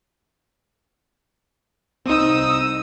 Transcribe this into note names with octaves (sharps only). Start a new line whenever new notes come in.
C2 C4 D#4 D#6 E6